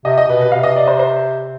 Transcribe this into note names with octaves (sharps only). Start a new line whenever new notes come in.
C3 D#5
D#5
B2 B4
B4
B2
C3 F5
D#5
D5
C5
C5